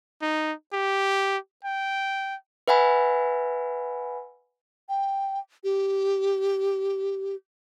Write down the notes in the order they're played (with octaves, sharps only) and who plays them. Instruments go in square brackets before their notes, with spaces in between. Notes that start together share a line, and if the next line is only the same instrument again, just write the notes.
[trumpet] D#4
G4
G5
[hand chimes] B4 E5 F#5 G#5 B5
[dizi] G5
G4